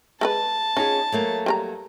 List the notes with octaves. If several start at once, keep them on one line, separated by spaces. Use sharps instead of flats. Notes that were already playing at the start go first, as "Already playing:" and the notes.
G#3 A4 B4 A5
C#4 D#4 F4 G#4
F#3 A3 A#3
G3 C5 A#5